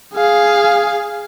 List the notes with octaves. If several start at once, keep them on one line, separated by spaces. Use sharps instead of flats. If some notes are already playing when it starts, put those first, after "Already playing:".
G#4 F5